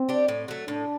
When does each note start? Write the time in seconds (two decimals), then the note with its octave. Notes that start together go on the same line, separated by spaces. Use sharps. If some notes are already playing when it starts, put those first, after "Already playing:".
Already playing: C4
0.09 D4 G4
0.28 A2
0.48 F#3 A3
0.68 A2 D4